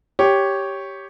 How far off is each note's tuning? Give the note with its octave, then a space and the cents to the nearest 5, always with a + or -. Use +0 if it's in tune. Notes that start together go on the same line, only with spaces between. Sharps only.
G4 +0 C#5 +0